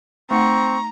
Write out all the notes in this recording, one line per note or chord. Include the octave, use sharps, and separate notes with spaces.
A3 C4 D#4 F#5 A#5 C#6